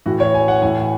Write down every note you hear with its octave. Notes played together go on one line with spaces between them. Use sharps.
A2 E3 F#4
C#5
G#5
F#5
A2 E3 G#5